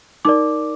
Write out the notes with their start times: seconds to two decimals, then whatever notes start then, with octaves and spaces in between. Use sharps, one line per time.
0.25 D#4 A#4 D5 D6